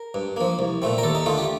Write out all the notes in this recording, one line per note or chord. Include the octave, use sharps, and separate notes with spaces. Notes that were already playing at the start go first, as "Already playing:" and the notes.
Already playing: A#4
G2
F3 A#3
C2
A#2 A3 C4
A#4
D#2 A4
D#4
D3 A3 F4
G4